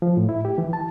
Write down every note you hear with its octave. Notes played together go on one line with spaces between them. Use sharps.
F3
A2
E4
G4
E3
A5